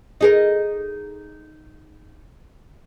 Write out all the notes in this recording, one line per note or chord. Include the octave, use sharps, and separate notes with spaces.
D#4 G#4 A#4